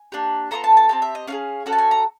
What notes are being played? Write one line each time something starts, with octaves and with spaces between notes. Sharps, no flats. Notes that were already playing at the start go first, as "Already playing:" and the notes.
Already playing: G#5
A#3 D4 G4
B3 D4 F4 A4 A#5
A5
A5
C4 E4 G4 A5
E5
D#5
C#4 F4 G#4 F5
C#4 F#4 A4 F#5
A5
G#5
A#5